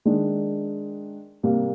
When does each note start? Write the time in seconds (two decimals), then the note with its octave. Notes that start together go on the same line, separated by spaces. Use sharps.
0.05 D#3 G#3 D4
1.43 C3 G3 A#3